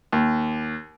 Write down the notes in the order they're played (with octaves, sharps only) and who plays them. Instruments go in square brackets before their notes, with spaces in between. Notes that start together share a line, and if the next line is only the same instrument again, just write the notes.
[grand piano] D#2